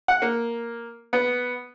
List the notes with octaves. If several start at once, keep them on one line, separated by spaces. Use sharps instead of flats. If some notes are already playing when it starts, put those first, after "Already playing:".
F#5
A#3
B3